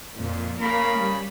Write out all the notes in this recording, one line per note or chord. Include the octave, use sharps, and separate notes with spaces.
F2 A#2
C#3 A#3 A#4 F5 B5
G3